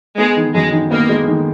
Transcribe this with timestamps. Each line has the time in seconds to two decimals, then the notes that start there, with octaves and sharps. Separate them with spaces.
0.18 G#3 B3
0.37 D#3
0.54 F#2 G#3
0.72 D#3
0.91 A#3 B3
1.09 G#3
1.27 D#3